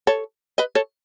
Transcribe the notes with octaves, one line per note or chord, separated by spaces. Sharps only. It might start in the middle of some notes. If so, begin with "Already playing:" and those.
A4 C#5
B4 D#5
A4 C#5